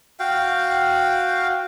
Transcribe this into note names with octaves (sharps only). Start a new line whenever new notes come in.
F#4 F5 G5